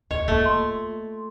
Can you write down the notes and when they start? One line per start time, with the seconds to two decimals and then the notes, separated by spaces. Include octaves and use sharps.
0.11 D#2 C#5 D#5
0.28 A3 A#3 F4
0.46 C6